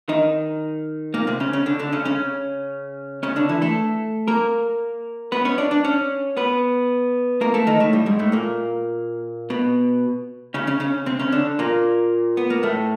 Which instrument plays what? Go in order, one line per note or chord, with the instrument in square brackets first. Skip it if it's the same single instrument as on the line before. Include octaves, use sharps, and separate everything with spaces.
[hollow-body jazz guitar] D#3 D#4
A#2 A#3
C3 C4
C#3 C#4
C#3 C#4
D3 D4
D3 D4
C#3 C#4
C#3 C#4
C#3 C#4
D3 D4
E3 E4
A3 A4
A#3 A#4
B3 B4
C#4 C#5
D4 D5
D4 D5
C#4 C#5
B3 B4
A#3 A#4
A3 A4
D#3 D#4
A2 A3
G2 G3
G#2 G#3
A2 A3
A#2 A#3
B2 B3
C#3 C#4
C#3 C#4
C#3 C#4
C3 C4
C#3 C#4
D3 D4
A#2 A#3
B3
A#3
A2 A3